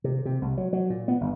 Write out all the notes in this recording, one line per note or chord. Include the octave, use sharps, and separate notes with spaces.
C3
C3
C2
F#3
F#3
A#2
B3
G1